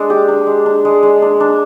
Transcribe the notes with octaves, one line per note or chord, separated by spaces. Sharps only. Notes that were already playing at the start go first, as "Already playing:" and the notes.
Already playing: G#3 D4
G4
D4
G#3
D4
G#3
G#3
D4
D4